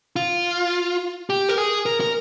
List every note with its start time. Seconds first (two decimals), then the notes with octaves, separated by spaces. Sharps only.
0.16 F4
1.30 G4
1.49 A#4
1.58 G#4
1.86 A#4
2.01 A#4